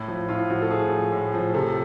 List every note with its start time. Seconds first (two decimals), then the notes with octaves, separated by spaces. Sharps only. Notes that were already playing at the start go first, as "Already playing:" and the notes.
Already playing: A2 E4
0.08 F3
0.29 A2 F4
0.50 F3 F#4
0.62 A4
0.70 A2 G#4
0.92 F3
1.12 A2
1.34 F3
1.54 C3 A4